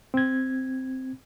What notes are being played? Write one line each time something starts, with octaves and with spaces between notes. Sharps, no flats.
C4 G#6